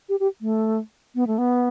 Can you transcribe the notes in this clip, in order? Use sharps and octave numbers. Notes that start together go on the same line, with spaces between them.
G4
G4
A3
B3
A3
B3